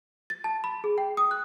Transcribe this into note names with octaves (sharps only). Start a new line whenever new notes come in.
A6
A5
B5
G#4
G5
D#6
F#6